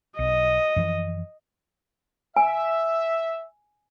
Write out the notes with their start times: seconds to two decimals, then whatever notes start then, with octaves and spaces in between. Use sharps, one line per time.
0.19 B1 D#5
0.76 F#2 E3 F3
2.37 E5 G#5